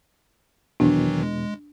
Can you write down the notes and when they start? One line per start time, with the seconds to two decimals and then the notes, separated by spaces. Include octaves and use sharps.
0.80 E2 B2 D#3 E3 F#3 D4
1.23 G#3